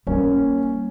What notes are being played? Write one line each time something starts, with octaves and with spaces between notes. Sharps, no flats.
G3 A#3 C#4